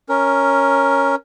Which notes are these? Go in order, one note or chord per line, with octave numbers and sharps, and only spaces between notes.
C#4 A#4